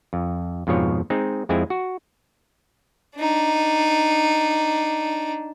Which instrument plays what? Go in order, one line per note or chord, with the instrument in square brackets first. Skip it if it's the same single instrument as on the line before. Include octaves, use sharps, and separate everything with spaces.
[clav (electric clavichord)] F2
F2 G#2 B2 F3 C#5
G#3 C4 D#4
F2 G#3 C4 E4 G#5
F#4
[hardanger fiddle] D4 D#4